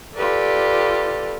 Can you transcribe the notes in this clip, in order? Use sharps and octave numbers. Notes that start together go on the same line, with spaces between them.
F4 G4 A4 B4 D5